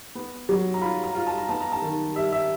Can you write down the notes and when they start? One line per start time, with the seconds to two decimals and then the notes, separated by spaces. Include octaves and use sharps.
0.15 B3
0.49 F#3
0.74 A#5
0.81 F4 B5
1.04 A#5
1.15 F4
1.27 A5
1.38 A#5
1.49 B3 A5
1.61 A#5
1.72 A5
1.82 D#3
2.15 G3 E5
2.32 E5